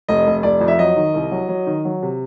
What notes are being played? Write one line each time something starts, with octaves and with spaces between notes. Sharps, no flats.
F1 D#5
F1
F1 D5
F2
E5
F#3 D#5
D#3
C2
F#3
F#3
D#3
F#3
C3